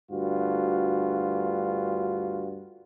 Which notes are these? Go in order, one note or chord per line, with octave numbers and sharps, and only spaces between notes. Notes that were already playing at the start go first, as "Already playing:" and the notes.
D2 G2 F4 F#4